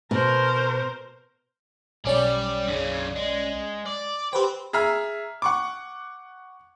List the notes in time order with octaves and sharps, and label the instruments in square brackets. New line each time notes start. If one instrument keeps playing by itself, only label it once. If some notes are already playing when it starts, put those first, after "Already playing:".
[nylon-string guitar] B2 [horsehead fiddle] A#4 C5
[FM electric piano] B1 C#4 D5 [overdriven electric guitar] G3
[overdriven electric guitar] F#2 C#3
G#3
D5
[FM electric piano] G4 B4 C5 [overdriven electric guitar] G5 C6
[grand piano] G#4 E5 A#5 F6
F#5 C#6 D6